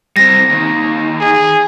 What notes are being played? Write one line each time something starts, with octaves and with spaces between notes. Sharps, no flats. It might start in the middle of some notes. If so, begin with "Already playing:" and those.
G3 C4 A#6
D#2 D#3
G#4